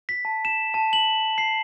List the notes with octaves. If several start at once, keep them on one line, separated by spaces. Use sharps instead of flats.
B6
A5
E7
A5
F#7
C7